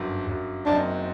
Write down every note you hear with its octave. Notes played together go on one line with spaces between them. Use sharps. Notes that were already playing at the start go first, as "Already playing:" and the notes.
Already playing: G1 F#2 F#3
G1 F#2 F#3
F#1 F#2 F#3 C4 D4 D#4